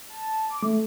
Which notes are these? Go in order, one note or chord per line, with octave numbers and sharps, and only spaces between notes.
A5
D6
A3